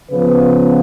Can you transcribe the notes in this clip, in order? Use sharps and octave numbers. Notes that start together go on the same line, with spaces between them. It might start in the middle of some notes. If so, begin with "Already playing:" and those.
C#3 F3 B3 B4